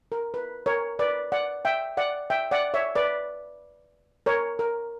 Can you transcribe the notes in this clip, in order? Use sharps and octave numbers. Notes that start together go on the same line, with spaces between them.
A#4
B4
A#4 C#5
B4 D5
D5 F#5
E5 G5
D5 F#5
E5 G5
D5 F#5
C#5 E5
B4 D5
A#4 C#5
A#4